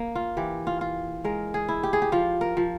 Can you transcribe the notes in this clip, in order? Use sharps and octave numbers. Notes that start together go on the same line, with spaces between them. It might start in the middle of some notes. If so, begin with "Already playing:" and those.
Already playing: A#3
F4
E3 G4
F4
F4
G#3 A#4
G#4
E4
G4
G#4
G4
F3 F4
A#4
F3